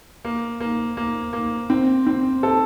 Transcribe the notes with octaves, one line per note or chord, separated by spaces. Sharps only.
A#3
A#3
A#3
A#3
C4
C4
A4